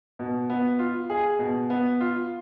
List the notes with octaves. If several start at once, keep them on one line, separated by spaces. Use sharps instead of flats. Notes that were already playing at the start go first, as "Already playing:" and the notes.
B2
B3
F4
G#4
B2
B3
F4